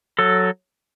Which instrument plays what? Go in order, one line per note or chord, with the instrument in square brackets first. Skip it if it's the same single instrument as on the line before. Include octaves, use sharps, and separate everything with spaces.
[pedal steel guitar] F#3 A4